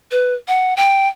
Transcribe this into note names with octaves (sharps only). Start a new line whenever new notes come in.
B4
F#5
G5